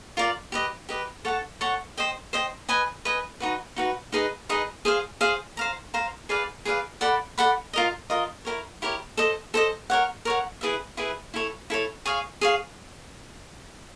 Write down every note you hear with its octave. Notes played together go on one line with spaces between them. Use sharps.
F4 A#4 D5
G4 B4 D#5
G4 B4 D#5
A4 C#5 F#5 A5
A4 C#5 F#5 A5
C5 D#5 G5
C5 D#5 G5
B4 D#5 G#5
B4 D#5 G#5
D#4 F#4 B4
D#4 F#4 B4
D#4 G#4 B4 D#5
D#4 G#4 B4 D#5
G#4 C5 F5
G#4 C5 F5
C5 F5 A#5
C5 F5 A#5
G#4 B4 D5 F5
G#4 B4 D5 F5
A4 D5 F#5 B5
A4 D5 F#5 B5
F4 A#4 D#5
F4 A#4 D#5
E4 G4 A#4 C#5
E4 G4 A#4 C#5
A4 C5 D#5
A4 C5 D#5
A#4 C#5 F#5
A#4 C#5 F#5
E4 G#4 B4 E5
E4 G#4 B4 E5
E4 A4 C#5
E4 A4 C#5
G#4 C#5 F5
G#4 C#5 F5